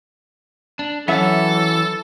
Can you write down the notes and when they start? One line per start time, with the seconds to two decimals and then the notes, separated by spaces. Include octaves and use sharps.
0.79 D4
1.08 E3 F#3 C#4 A4 E5 F#5